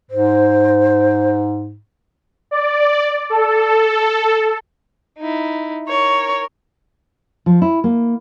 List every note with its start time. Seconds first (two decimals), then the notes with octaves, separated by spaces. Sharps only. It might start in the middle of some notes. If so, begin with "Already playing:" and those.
0.11 G#2 C5
2.51 D5
3.30 A4
5.18 D#4 E4
5.88 A#4 C#5
7.46 F3
7.62 E4
7.84 A#3